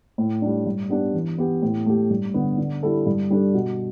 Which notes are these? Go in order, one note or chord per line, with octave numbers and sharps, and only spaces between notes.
A2
G3 D4
G2
G3 B3 D4 G4
E3
B3 G4
A2
A3 G4
G2
D3 B3
D3
G3 E4 A4
G2
G3 D4 A4
B2